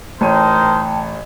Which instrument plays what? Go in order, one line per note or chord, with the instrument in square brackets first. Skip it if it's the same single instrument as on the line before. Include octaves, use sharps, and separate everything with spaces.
[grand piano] A1 C#5 D#7 [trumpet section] D#4 A#4 C5 [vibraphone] G5 A5